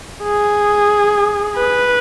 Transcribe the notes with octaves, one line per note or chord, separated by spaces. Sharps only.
G#4
B4